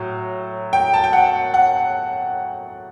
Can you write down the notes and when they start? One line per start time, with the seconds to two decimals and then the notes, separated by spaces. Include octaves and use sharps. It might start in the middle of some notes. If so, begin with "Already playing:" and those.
Already playing: A2 F#3
0.73 G5
0.94 A5
1.04 G5
1.13 F#5
1.54 F#5